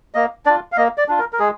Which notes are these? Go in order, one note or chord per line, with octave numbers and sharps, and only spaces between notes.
A#3 D#5
D4 F4 D5
F5
A#3 D#5
D5
D4 F4
A#4
A#4
G#3 G#4